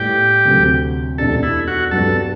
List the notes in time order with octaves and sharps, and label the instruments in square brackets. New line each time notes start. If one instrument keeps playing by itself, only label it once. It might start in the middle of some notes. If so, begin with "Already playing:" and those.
Already playing: [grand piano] A2 G3 B3 [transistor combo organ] G4
[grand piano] D2 C3 F#3
[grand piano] E2 B2 A3 D4 G4 [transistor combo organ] A4
[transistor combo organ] E4
F#4
[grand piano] G2 F#3 B3 D4 G4 [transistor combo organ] A4